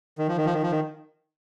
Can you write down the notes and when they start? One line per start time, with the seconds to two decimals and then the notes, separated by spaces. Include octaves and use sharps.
0.18 D#3
0.28 F3
0.37 D#3
0.45 F3
0.54 D#3
0.63 F3
0.71 D#3